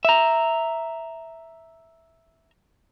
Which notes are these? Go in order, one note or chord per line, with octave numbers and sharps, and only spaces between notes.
E5 A#5